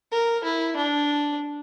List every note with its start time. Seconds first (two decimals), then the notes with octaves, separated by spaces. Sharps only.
0.11 A#4
0.44 E4
0.76 D4